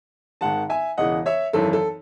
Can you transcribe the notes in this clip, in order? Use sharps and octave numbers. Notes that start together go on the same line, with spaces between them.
G#1 G#2 D#3 F#5 A5
E5 G#5
E1 E2 C#3 E3 D#5 F#5
C#5 E5
G#1 F#2 E3 A4
A4